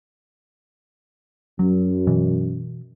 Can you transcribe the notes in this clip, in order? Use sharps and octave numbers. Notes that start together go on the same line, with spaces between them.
F#2 F#3
B2 E3